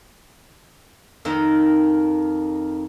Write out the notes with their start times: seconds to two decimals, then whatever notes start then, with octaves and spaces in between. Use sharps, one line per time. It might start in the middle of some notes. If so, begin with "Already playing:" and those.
1.25 F2 D#3 D#4